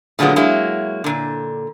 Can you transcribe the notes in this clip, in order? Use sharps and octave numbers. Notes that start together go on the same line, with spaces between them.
A#2 D3 F#3 G#3 B3
F#3 G#3 A#3 E4
A#2 D3